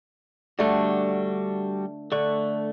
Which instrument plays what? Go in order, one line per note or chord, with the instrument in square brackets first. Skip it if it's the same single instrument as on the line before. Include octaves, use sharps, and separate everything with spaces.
[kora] D3 A3 [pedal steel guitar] G3 D4 F#4
[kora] D3 [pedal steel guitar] A3 C#6 F#6